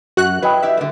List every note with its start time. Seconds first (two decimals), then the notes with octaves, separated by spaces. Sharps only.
0.17 F#2 F#4 F#6
0.42 F#3 E4 B4 D#5 G5
0.62 E4 G4 E5
0.77 D3 A3